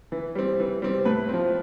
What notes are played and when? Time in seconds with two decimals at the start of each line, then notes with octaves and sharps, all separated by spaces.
0.12 E3
0.35 G3 C4
0.60 E3
0.82 G3 C4
1.05 A2 B4
1.29 F3 C4